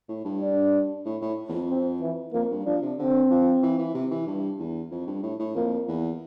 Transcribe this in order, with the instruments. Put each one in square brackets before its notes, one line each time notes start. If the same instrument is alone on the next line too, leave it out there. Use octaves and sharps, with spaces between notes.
[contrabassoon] A2
G2
[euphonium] D4
[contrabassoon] A2
A2
E2
F2
[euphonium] C4
E3
[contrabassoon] F2 [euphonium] A#3
[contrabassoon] G2
[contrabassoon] F3 [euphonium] D4
[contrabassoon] C3
[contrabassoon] D3 [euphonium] C4
[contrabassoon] F3
E3
E3
C3
E3
G2
E2
F2
G2
A2
A2
[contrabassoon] F2 [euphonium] A#3
[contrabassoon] E2